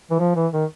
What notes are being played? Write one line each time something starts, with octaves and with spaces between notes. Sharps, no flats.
E3
F3
E3
D#3